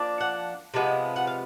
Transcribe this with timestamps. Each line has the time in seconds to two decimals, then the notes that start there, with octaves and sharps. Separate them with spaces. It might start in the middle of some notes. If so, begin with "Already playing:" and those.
Already playing: F3 A#3 D4
0.21 F#5
0.74 C3 F3 G#3 B3
1.16 F#5
1.27 F5